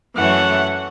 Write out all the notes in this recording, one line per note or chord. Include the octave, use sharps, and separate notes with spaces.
F#2 E3 A3 C#4 F#5